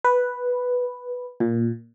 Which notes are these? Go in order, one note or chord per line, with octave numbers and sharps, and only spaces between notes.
B4
A#2